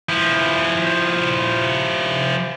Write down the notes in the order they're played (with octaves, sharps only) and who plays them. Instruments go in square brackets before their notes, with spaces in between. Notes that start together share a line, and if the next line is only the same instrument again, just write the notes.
[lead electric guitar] F3 E4